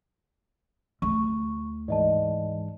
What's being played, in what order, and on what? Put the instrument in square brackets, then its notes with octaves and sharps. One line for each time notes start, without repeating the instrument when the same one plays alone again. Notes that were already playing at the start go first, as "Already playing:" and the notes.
[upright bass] D2 [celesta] C#6
[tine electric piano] G#2 E3 G#3 [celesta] D5 D#5 A5